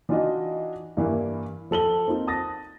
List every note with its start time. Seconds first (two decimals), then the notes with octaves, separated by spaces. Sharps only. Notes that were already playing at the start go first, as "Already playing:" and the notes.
0.09 E3 D4 D#4 F4 F#4 D#5
0.97 G2 E3 A#3 E4
1.71 F3 A4 F#7 G7
2.06 A#3 C4 D#4 F4
2.27 A5 D#6 A6 A#6